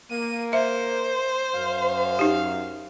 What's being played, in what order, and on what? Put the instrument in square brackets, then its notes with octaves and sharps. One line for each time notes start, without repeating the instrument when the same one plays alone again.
[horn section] A#3 [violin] D#7
[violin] C5 [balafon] E5
[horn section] F#2 F5
[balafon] D#4 G4